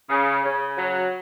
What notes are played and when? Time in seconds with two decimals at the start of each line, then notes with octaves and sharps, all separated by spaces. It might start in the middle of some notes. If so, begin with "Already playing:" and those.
0.10 C#3
0.44 C#3
0.78 F#3